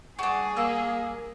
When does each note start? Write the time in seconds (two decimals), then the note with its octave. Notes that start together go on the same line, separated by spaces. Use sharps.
0.19 G3 D4 F#4 G#4
0.57 A#3 E6